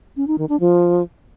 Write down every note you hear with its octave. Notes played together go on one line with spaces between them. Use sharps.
C#4
D#4
D#3
D4
F3